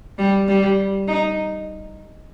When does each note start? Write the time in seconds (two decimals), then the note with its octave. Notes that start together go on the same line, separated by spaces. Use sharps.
0.18 G3
0.48 G3
1.08 D#4